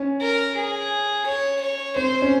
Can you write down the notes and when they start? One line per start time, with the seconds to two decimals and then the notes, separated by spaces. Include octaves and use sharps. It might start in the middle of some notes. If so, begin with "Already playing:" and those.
Already playing: C#4
0.21 A#4
0.56 G#4
1.27 C#5
1.61 C#5
1.96 C4 C5
2.22 C#4